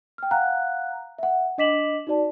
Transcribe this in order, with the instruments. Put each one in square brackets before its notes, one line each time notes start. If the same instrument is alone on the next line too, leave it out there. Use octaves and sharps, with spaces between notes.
[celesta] G5 F6
F5 F#5 A#5 F#6
E5 F#5
D4 D#5 D6 B6 E7 F#7
D#4 F#4 D5 A5